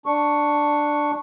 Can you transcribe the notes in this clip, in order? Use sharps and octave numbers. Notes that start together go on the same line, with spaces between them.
D4 C#6